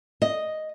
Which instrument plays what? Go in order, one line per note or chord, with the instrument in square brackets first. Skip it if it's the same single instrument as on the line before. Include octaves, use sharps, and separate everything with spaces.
[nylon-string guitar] D#5